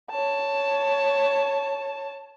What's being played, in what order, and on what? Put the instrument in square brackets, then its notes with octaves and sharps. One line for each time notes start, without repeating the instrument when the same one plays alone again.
[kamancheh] C#5 A5